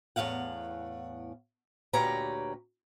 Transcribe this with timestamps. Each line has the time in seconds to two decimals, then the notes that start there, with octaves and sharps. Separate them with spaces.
0.16 E2 A2 C3 F5 F#5
1.93 D2 A#2 G4 B4 C#5 A#5